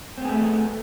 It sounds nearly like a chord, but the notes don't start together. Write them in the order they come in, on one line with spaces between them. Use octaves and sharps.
C4 B3 G#4 A3